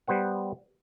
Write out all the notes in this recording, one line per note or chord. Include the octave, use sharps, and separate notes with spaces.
G3 B3 C5 F#5